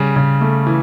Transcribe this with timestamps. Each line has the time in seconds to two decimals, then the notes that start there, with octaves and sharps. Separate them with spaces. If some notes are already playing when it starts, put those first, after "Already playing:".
Already playing: C#3 G3
0.16 C#3
0.41 A3
0.67 E3